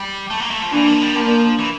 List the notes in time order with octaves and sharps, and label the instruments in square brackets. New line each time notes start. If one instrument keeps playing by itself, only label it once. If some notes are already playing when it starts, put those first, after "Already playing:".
Already playing: [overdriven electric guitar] G3
A3
A#3
A3
F3
[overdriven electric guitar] E3 [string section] A#3 D4
[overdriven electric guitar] F3
G3
[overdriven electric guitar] F3 [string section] A#3 D4
[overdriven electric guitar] E3